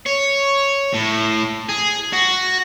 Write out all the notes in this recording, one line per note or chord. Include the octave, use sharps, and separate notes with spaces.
C#5
A2
G#4
F#4